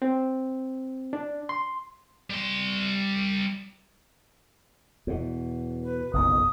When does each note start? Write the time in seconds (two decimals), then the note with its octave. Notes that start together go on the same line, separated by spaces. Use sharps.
0.02 C4
1.13 D4
1.49 C6
2.30 G3 C6
5.07 E2 B2
5.83 B4
6.13 F#1 B1 F2 D#6